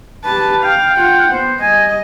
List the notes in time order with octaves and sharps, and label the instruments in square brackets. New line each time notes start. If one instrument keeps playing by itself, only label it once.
[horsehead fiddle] G4 A5 [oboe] B4
[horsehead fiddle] F5 [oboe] G5
[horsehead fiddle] F4 F#5
[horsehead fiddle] B3 [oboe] C5
[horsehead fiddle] G3 D#5 [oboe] G#5